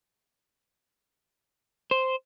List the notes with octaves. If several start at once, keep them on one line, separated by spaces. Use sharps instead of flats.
C5